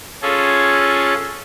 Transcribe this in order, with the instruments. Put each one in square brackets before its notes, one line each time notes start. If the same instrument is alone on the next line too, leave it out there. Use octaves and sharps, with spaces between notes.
[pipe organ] C#4 F4 G#4 A4